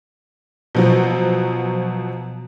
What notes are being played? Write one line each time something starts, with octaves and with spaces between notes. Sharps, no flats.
B2 F3 F#3